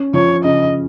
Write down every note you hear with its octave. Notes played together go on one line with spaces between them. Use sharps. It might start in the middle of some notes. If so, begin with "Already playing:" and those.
Already playing: C#4
F3 C#5
C#3 D#5